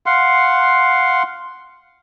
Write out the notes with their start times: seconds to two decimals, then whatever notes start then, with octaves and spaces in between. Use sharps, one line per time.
0.06 F5 F#5 C6